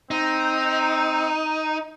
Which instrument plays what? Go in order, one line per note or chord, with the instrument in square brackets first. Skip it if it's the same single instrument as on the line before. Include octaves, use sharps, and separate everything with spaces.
[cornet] C4 [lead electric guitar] D#4